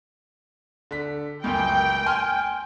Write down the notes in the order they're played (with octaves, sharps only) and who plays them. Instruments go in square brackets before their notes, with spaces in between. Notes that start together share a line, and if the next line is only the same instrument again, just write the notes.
[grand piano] D3 B6
[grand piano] C#2 F#2 A#2 [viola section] G5
[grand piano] G#5 C6 F6